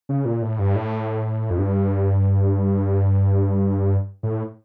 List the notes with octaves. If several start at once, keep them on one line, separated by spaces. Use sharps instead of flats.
C#3
A#2
A2
G2
A2
F2
G2
A2